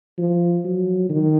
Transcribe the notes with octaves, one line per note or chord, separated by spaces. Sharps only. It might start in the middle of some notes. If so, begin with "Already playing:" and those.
F3
F#3
D#3